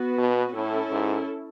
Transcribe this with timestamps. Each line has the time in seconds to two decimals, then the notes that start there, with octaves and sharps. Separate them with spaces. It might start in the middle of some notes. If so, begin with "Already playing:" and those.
Already playing: B3 F#4 B4
0.18 B2
0.54 A2 C#4 E4 A4
0.91 G#2